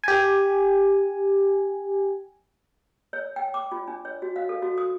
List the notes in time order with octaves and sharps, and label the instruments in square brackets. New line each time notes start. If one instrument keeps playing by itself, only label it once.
[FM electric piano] G4 G#5
[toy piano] C#5
G5
D6
F4
D4
C#5
F#4
F5
A4
F#4
D#6